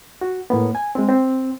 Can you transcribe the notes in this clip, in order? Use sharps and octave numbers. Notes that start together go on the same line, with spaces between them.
F#4
A2 A#3 B3
G#5
G#3 C4
C4